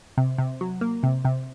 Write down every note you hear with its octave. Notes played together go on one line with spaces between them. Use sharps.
C3
C3
F#3
A#3
C3
C3